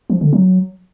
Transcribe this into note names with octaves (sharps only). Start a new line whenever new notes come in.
F3
D3
F#3